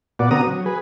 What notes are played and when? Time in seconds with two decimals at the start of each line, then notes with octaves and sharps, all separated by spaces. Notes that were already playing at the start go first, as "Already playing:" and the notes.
0.19 A#2 B3 F#4 D5
0.31 D3 B3 C4 F#4 A#5 D#6
0.47 F#3
0.66 G#4 B4